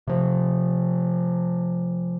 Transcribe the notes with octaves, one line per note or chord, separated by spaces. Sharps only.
C3 F3